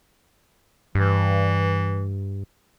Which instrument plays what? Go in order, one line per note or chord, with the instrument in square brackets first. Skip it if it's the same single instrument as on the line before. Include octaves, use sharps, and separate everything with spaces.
[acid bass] G2 [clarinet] E3